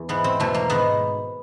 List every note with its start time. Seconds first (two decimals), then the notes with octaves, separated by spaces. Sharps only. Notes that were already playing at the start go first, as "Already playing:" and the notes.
Already playing: E2
0.09 G#2 E3 B3
0.24 C4
0.40 E2 B2 A3
0.54 A#3
0.70 G#2 D#3 B3